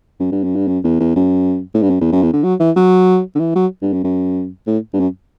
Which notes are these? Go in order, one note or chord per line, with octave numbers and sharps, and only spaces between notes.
F#2
G2
F#2
G2
F#2
E2
E2
F#2
A2
G2
F#2
E2
F#2
E2
D3
F#3
E3
F#3
D3
E3
F#3
G2
F#2
F#2
A2
G2
F#2